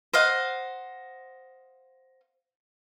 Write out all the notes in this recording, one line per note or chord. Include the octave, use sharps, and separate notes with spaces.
C5 D#5 F5 F#5